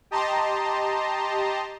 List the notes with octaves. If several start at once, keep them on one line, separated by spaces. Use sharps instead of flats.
G4 D#5 A5 A#5 C6